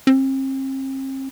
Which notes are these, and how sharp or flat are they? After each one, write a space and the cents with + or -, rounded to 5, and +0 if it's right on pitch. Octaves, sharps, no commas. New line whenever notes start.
C4 +40